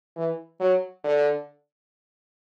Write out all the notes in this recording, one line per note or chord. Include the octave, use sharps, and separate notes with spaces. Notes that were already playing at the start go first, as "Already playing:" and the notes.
E3
F#3
D3